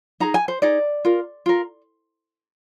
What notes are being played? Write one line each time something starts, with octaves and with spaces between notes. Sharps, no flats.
D#4 G#4 A#5
G#5
C5
D#4 G#4 D5
F4 A#4
F4 A#4